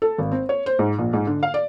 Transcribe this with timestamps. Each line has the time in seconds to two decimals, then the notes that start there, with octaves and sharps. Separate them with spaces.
0.02 A4
0.18 G#1
0.32 C4
0.49 C#5
0.66 C5
0.79 G#2
0.98 A#1
1.13 G#2
1.27 D3
1.43 F5
1.54 D5